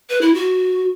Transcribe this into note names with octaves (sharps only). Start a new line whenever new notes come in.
B4
E4
F#4